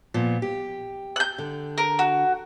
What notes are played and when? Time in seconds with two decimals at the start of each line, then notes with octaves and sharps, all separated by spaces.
0.14 A#2 F3 B3
0.42 G4
1.16 F#6 G6
1.38 D3
1.78 A#4
1.99 F#4